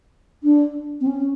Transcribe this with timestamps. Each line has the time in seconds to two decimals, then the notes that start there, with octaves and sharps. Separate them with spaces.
0.44 D4
1.01 C4
1.07 C#4